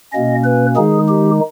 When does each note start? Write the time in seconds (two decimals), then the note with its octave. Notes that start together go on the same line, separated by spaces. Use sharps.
0.13 B2 A#3 C#4 D#5
0.44 B4
0.76 D#3 G#3 D#4 G#4
1.08 G4